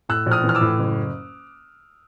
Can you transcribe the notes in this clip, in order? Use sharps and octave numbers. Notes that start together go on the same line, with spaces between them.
A2 E6 F#6
A#1
D#6 F6
E3
F6
D6 E6
A2
F#1